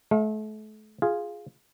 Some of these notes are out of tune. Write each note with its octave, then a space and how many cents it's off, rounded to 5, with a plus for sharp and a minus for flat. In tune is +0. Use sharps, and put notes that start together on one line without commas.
A3 -35 F5 +30
F4 +0 G#4 +0